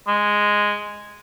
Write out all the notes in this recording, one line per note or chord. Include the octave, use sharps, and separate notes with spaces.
G#3